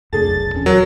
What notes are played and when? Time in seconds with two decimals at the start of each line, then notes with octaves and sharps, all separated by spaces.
0.13 F2 C3 A3 D4 G#4 A4 A6
0.26 F1 B1
0.53 D#1 E2 C#4
0.66 F#3 A#4